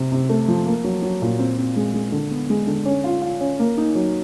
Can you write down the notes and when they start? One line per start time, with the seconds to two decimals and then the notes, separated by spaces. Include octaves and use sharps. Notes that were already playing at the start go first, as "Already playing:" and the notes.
Already playing: C3
0.12 C3
0.29 A3
0.48 F3
0.66 A#3
0.84 F#3
1.02 F#3
1.22 A#2
1.39 C4
1.58 C4
1.76 G#3
1.94 G#3
2.12 D3
2.31 B3
2.50 G#3
2.67 D3
2.85 C#4
3.04 F4
3.22 F4
3.40 C#4
3.59 A#3
3.78 D#4
3.95 F#3